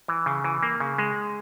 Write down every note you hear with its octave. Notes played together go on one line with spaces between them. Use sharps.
E3
C#3
E3
A#3
C#3
G#3